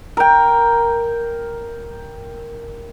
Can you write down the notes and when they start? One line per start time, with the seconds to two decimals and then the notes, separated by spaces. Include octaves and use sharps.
0.17 A#4 G5